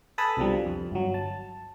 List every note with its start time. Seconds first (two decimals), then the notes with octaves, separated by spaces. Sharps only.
0.18 A4 B4 G#5 A5 B5 D#6
0.37 C2 B2 D3 F3 G3
0.66 F2
0.91 G1 F#3
1.14 A5